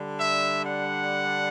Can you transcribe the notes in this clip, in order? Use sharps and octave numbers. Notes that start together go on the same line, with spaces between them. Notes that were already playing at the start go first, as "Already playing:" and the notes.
Already playing: D3 G3 D4
E5
F#5